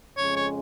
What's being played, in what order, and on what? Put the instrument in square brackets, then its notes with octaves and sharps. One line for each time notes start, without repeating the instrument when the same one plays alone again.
[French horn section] F2 C#3 G#3 C#4 [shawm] C#5
[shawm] C#5